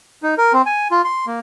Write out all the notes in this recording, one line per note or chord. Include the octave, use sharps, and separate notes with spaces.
D#4
A#4
C4
G#5
F4
C6
A#3